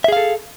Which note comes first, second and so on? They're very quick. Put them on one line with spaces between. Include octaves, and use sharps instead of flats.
E5 G#4 F5 A4